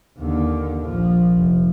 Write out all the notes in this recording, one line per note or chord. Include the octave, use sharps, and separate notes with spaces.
D#2 D3
A#1 F3
F1